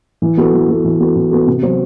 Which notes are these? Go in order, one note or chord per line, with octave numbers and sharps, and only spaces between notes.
E3
B3 F#4 A4
E3
B3 F#4 A4
E3
B3 F#4 A4
E3
B3 F#4 A4
C3
F#3 B3 F#4 C5